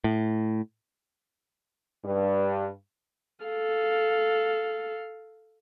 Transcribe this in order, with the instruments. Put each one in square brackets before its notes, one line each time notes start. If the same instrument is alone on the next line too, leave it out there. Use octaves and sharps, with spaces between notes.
[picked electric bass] A2
[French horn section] G2
[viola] A4 F5